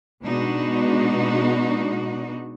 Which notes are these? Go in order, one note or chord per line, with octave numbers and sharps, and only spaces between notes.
B2 G#3 B3 D4 D#4 F#4